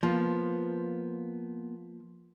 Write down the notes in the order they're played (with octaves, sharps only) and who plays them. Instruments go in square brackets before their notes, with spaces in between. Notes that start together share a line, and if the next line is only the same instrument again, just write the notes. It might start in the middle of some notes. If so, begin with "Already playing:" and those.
[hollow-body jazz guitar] F3 [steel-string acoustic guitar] A#3 B3 F5